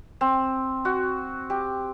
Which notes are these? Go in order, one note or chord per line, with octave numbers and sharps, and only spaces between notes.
C4
F#4
G4